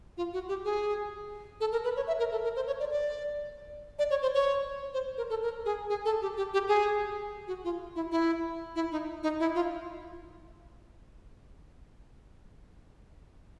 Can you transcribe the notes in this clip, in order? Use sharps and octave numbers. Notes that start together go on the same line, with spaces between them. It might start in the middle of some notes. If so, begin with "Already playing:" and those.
F4
F#4
G4
G#4
A4
A#4
B4
C#5
E5
A#4
A4
A#4
C5
C#5
D5
D5
D5
C#5
C5
C#5
C5
A#4
A4
A#4
G#4
G#4
A4
G4
G4
G4
G#4
F#4
F4
E4
E4
E4
D#4
D#4
E4
F4